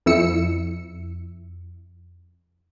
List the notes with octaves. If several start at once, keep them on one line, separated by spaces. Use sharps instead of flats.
F2 E4 E6 C#7